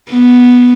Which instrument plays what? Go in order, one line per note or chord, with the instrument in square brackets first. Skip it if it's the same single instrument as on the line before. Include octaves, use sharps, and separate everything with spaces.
[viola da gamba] B3